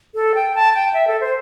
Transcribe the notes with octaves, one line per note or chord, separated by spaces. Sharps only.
A4
G5
A5
G5
E5
A4
C5